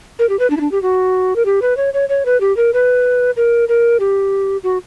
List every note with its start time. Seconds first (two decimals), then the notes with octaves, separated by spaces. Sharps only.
0.19 A#4
0.29 G4
0.39 B4
0.50 D4
0.57 E4
0.61 D4
0.72 G4
0.82 F#4
1.36 A#4
1.46 G4
1.62 B4
1.77 C#5
1.94 C#5
2.09 C#5
2.26 B4
2.41 G4
2.57 A#4
2.74 B4
3.37 A#4
3.69 A#4
4.00 G4
4.64 F#4